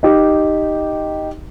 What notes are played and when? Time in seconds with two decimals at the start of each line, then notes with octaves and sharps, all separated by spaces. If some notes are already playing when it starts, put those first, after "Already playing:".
0.03 D#4 G4